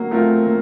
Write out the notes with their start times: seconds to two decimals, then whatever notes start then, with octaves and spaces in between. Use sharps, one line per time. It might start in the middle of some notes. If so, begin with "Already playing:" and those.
Already playing: F#3 A#3
0.11 A3 C4 F4 A#4
0.46 A#3